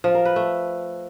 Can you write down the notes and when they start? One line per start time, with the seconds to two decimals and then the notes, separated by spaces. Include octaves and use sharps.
0.04 F3
0.15 A#4
0.25 B4
0.36 A3